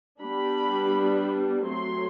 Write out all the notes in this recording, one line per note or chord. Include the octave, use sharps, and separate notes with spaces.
G3 B3 D4 B5
F#3 A3 C4 C6